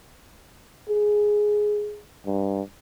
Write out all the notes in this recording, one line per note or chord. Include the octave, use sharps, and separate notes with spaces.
G#4
G2